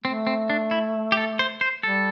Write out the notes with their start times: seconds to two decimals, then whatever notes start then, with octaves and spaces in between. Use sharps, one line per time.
0.04 A3 C4
0.27 C4
0.50 D4
0.71 E4
1.12 G4
1.17 A4
1.39 C5
1.61 C5
1.83 G3 A4